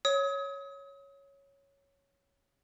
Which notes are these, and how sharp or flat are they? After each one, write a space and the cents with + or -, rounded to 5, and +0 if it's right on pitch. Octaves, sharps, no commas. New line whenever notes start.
C#5 +0 D#6 +35